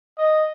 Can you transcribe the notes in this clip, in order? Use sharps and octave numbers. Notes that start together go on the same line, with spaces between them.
D#5